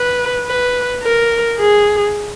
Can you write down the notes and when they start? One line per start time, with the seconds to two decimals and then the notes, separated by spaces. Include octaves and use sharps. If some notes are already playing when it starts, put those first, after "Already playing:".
Already playing: B4
0.46 B4
1.03 A#4
1.59 G#4